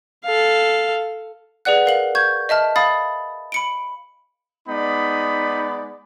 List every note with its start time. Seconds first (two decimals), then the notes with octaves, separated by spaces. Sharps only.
0.24 A4 F5
1.65 G#4 B4 D5 F#5 F#6
1.86 A#4 F5 F#7
2.15 C#6 G6 G#6
2.49 D#5 E5 A5 F6
2.76 F5 B5 D#6 A6
3.52 B5 C#7 D7
4.69 G#3 B3 D#4 D5 B5